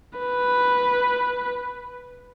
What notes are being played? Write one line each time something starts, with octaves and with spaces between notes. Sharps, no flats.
B4